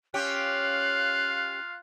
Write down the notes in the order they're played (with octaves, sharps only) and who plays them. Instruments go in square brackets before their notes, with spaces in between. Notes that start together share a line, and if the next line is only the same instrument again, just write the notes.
[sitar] C#4 G4 [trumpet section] F4 F5 [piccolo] F#6